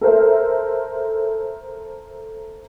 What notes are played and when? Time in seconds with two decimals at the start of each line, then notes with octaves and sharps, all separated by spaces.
0.01 A4 A#4 C5 E5